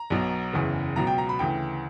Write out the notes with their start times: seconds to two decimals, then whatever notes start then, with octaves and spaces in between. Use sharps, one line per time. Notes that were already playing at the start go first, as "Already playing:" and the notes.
Already playing: A#5
0.10 B1 B2 F#3
0.53 F#1 E2 C#3 E3
0.96 C#2 B2 F#3 A#5
1.07 G5
1.18 A#5
1.29 B5
1.39 D2 C#3 E3 G5